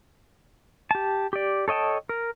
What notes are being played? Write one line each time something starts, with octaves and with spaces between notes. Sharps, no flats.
G4 A5
G4 D5
A4 C#5 D#5 G5 A5
A#4